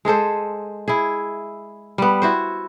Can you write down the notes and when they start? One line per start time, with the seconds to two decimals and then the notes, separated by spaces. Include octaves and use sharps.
0.05 G#3 G#4 A4 C5
0.88 E4 G#4
1.98 G3 B3
2.22 E4 F#4 C5